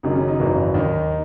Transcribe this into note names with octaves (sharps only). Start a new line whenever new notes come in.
F#1 F#2 D#3 D#4
C#4
D#4
G#1 F#2 C#3 E3
D#2 D#3 D#4